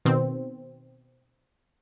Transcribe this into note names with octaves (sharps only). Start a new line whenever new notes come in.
B2 D#3 C4